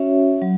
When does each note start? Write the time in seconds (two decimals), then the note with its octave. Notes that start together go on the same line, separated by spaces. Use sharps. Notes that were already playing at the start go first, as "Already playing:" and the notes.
Already playing: C#4 F#4 C#5 E5
0.42 F#3